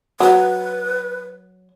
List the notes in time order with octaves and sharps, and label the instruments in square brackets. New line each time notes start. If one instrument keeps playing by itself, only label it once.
[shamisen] F#3 [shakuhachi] B4